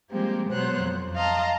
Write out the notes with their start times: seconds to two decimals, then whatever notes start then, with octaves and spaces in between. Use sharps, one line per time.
0.10 F3 G3 G#3 A#3 C4 G4
0.50 B2 F#3 B3 C5 C#5 F#6
0.81 F2
1.16 D#5 F5 A5 A#5 C6